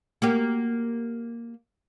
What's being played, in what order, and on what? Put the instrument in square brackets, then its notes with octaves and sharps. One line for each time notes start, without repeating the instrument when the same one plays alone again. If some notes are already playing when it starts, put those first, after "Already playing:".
[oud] A#3 F#4 G4